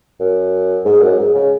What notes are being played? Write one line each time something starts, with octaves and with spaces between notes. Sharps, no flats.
F#2
G#2
F#2
G#2
C#3